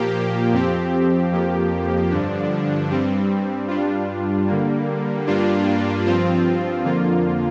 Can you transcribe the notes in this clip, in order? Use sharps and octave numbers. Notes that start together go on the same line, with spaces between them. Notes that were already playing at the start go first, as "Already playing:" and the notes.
Already playing: A#2 F3 A#3 G4
F2 F3 C4 G4
F2 F3 A#3 G4
G2 D3 F3 D4
G2 G3 C4
G2 G3 D4 F4
D3 G3 A#3
G2 G3 A#3 D4 F4
G2 F3 C4 F4
F2 D3 F3 A#3 F4